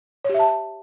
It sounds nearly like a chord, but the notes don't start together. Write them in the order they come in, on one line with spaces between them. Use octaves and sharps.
C#5 G4 E5 A5